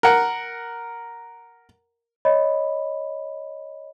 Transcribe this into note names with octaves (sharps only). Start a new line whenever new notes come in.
A#4 F#5
C#5 D#5 B5